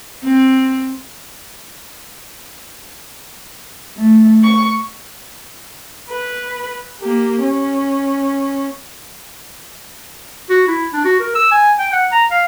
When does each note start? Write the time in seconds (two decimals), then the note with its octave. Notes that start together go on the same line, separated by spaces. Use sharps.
0.24 C4
3.97 A3
4.43 C#6
6.10 B4
7.02 A#3 G4
7.43 C#4
10.50 F#4
10.68 E4
10.93 D4
11.05 F#4
11.20 A#4
11.35 E6
11.51 G#5
11.79 G5
11.93 F#5
12.12 A#5
12.31 F5